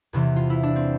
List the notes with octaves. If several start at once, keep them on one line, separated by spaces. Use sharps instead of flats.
E2 C3 E3
F4
E4
D4
C4